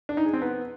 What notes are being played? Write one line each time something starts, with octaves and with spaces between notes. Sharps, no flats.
D4
D#4
G#4
C4
B3